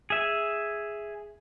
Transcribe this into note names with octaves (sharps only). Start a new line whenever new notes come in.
G#4 E5